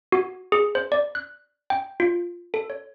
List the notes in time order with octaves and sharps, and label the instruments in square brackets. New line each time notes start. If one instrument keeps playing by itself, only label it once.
[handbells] F#4
G#4
C5
D5
F#6
G5
F4
A4
C#5